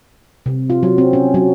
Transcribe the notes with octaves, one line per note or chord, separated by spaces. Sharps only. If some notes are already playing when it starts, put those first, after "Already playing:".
C3
F4
F#3
C4
C#4
F#3